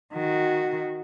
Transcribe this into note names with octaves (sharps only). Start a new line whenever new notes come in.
D#3 F#4